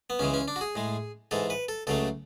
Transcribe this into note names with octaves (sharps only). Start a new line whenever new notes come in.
B3
C#2 C#3 E3 G#3 C#4
C#4
D4
F#4
G#4
A2 G#3
G#2 E3 G#3 A4
B4
A4
C#2 C#3 F#3 A3 A4